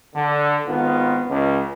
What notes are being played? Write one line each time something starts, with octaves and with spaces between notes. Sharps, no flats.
D3
G#1 D#3 B3 F4
C#2